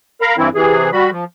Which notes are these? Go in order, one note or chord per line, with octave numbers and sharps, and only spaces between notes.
A#4 F5 A#5 B5
G2 E3 C4 E4
C3 E3 G#4
G3 F#4 B5
F3